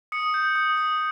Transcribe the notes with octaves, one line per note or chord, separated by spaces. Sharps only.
D#6 C#7
G6
D#6
D#6